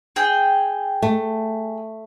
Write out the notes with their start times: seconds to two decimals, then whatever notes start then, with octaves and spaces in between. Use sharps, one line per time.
0.16 G#4 G5
1.02 A3